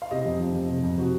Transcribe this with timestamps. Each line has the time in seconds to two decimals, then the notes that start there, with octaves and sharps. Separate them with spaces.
0.02 F5
0.11 C3 D#5
0.26 F2
0.40 F3
0.54 F2
0.70 C3
0.83 F2
0.98 C3 F#4